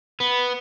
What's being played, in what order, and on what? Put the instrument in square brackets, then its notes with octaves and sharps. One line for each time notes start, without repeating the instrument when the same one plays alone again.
[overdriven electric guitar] B3